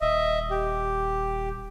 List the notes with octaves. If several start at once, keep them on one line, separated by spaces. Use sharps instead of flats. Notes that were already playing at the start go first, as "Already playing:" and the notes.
D#1 D#5 E5
G4